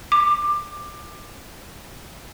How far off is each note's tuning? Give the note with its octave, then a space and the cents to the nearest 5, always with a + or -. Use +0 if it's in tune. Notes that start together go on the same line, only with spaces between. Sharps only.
D6 +20